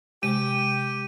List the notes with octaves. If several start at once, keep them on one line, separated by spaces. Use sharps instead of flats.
C3 G#3 G4 D#7